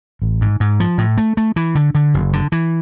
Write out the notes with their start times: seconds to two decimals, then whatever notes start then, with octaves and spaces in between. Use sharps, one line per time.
0.22 A1
0.41 G#2
0.60 G#2
0.80 F3
0.98 A2
1.18 A3
1.37 A3
1.56 E3
1.75 D3
1.95 D3
2.14 F#1
2.33 D3
2.52 E3